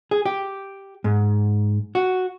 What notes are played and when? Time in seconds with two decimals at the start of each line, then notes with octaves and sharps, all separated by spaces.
0.11 G#4
0.26 G4
1.04 G#2
1.95 F#4